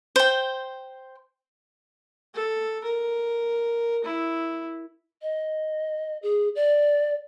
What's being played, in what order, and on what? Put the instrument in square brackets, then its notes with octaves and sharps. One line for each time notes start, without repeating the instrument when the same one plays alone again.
[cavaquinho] C5 G5
[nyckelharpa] A4
A#4
E4
[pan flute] D#5
G#4
D5